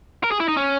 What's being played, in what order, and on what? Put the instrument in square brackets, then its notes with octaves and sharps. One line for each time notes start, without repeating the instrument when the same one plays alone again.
[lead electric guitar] A#4
G#4
E4
D#4
C#4